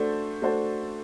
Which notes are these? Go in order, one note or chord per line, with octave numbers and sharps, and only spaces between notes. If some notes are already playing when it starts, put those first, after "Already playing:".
Already playing: A3 D4 F#4 A4 C5
A3 D4 F#4 A4 C5